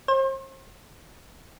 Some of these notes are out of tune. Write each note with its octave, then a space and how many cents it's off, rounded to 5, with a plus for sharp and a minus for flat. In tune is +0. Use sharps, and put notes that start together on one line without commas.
C5 +45